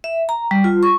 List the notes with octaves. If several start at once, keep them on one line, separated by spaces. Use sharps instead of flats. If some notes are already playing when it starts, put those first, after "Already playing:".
E5
A#5
G3
F4
C#6